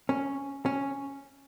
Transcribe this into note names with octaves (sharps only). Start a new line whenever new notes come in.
C#4
C#4